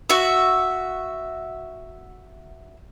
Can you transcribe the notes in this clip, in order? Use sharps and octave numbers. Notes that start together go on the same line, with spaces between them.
F#4 E5